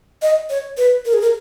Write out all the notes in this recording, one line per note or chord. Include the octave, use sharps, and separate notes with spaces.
D#5
C#5
B4
A#4
G#4
A#4